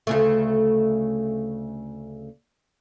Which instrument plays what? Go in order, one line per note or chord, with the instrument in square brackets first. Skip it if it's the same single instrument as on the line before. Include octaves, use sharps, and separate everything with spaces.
[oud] D2 C#3 A3